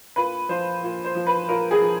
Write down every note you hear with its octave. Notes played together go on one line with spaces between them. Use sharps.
A#2 B4
F3 C5
A#2
C5
F3
B4
A#2 A#4
G#4
F3